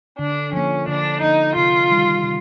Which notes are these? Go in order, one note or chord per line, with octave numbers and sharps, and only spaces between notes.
D3 D4
F3 A#3 C#4
D3 D4
F3 A#3 D#4
C3 F4
D#3 G3
C3